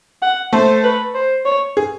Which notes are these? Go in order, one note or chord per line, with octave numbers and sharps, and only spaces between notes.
F#5
A3 A4 C5
B4
C5
C#5
G#4